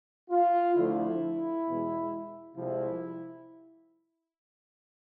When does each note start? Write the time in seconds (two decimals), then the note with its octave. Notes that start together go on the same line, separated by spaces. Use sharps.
0.30 F4
0.75 D2 D3 F3 A3 E4
1.66 E2 B2 G#3
2.57 C2 C3 F3 G#3 E4